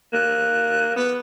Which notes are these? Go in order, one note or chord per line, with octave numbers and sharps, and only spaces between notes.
A#3 F#6
B3 B4